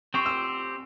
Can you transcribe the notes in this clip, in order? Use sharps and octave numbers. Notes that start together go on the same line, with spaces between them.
C4 G4 C5 C#6
E6